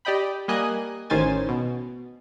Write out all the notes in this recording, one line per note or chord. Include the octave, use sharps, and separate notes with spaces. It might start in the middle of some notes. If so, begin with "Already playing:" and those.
G4 D5 D#5 G5 B5
G3 A#3 D#5 G#5 D#6 F#6
A1 D#3 C#4 C5 G#5 A6
B2